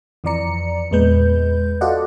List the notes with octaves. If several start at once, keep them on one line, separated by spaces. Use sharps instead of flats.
F2 E3 F3 D5 A#5 C#7
E2 A#2 G#3 B4 G6
F4 F#4 A4 D5 D#5 F#5